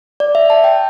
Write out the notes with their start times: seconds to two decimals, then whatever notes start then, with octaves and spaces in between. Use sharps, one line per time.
0.20 D5
0.35 E5
0.50 A5
0.64 G5